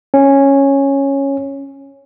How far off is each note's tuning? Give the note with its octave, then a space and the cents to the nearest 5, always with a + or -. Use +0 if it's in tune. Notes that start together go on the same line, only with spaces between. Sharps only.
C#4 -5